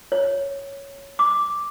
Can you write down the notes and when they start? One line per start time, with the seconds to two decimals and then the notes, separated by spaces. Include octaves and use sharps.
0.12 C#5
1.19 D6